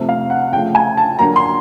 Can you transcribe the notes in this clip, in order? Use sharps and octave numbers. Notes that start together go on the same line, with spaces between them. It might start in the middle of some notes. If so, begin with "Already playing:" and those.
Already playing: C3 F3 A3 C4
F5
F#5
C#3 F3 A3 G5
G#5
A5
D3 F#3 A#3 A#5
C6